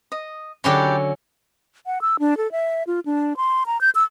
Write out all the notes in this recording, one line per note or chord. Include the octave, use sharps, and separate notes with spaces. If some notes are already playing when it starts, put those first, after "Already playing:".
D#5
D3 F#3 C#4 E4 G4 D5
F#5
E6
D4
A4
E5
F4
D4
C6
A#5
G6
E6